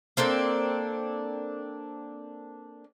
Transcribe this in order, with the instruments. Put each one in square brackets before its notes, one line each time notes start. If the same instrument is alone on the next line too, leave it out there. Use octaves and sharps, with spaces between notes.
[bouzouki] A#3 C4 D4 A4